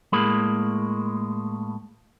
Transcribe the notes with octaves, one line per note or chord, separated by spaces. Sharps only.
A2 G#3 A#3 B5